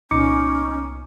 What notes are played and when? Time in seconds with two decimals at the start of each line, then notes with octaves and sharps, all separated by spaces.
0.11 C2 A#2 B3 C#4 D#4 D6 C#7